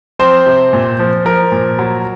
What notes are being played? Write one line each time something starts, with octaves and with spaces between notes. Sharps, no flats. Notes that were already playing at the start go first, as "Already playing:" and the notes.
F3 C4 C5
C3
A#2
F3
F3 A#4
A#2
F#3